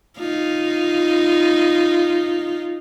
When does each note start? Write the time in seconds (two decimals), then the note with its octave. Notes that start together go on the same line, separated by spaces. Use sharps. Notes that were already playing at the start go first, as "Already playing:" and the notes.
0.19 D#4 F4